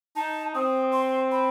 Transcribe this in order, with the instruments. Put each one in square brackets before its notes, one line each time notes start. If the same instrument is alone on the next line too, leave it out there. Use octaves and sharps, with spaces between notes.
[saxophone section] D#4 [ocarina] A5
[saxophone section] C4 [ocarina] D#6
[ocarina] C6
B5